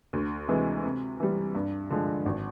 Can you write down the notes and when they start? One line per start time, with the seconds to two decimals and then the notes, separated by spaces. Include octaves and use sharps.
0.13 D2
0.48 C3 E3 G#3
0.83 C3
1.20 E3 G3
1.55 G2
1.90 D3 F3 G#3
2.26 G#1